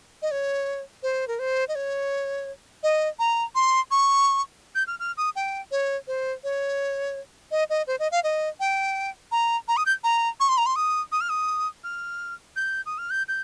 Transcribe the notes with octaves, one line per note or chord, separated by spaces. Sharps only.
D#5
C#5
C5
A#4
C5
D#5
C#5
D#5
A#5
C6
C#6
G6
F6
F6
D#6
G5
C#5
C5
C#5
D#5
D#5
C5
D#5
F5
D#5
G5
A#5
A#5
D#6
G6
A#5
C#6
C6
A#5
C6
D#6
D#6
F6
D#6
F6
G6
D#6
F6
G6
G6